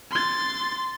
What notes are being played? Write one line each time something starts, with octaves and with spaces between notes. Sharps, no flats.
C6 A6